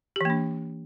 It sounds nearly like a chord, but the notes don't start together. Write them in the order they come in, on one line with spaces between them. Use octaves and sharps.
G4 E3 A#3 D4